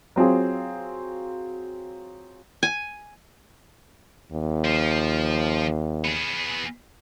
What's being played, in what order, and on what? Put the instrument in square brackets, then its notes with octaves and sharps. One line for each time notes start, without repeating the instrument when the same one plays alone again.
[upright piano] F#3 C4 F4 G#4
[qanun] G#5
[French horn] D#2
[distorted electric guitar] F3
B3 G#4